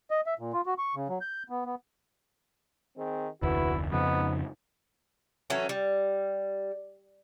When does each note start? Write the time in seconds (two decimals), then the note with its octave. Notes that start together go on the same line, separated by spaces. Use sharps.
0.11 D#5
0.26 E5
0.39 A#2
0.53 F4
0.66 F#4
0.78 C#6
0.95 C#3
1.09 F#3
1.21 G6
1.50 B3
1.65 B3
2.97 D#3 C4 G#4
3.42 F1 D2 E4 F#4 B4
3.92 F2 G#2 C#3 F3 B3 D#4
5.50 E3 F#3 A3 C#4
5.69 G3